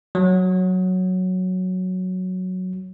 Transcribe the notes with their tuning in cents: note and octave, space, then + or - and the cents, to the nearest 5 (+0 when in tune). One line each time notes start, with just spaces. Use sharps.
F#3 -5